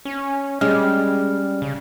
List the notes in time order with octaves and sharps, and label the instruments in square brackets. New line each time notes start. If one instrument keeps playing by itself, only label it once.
[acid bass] C#4
[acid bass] G3 [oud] G#3 [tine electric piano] C#4 F6
[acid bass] C#3